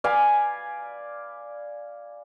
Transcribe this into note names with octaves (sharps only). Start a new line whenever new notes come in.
D5 F5 G#5 B5